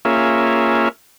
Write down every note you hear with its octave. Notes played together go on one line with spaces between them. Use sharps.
A#3 C#4 F4 G#4 E5